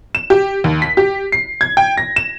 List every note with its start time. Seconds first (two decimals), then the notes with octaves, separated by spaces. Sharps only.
0.15 E7
0.30 G4
0.64 D#2
0.82 B6
0.97 G4
1.32 C7
1.61 G#6
1.77 G5
1.97 A#6
2.16 E7